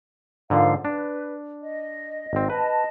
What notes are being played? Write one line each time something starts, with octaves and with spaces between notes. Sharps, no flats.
G#2 D3 F3 A#4 F5
D4 B4
D#5
G#1 C4
B4 D#5 A5